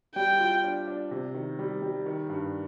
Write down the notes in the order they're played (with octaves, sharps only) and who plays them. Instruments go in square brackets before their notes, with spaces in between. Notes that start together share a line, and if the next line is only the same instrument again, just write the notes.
[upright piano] G3 [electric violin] G5
[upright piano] F4
D4
D4
C3
D#3
G3
G3
D#3
G2